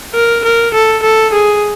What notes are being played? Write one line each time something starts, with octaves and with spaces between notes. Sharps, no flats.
A#4
A#4
A4
A4
G#4